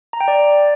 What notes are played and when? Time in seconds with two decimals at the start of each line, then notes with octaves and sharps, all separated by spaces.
0.13 A#5
0.20 G5
0.28 D5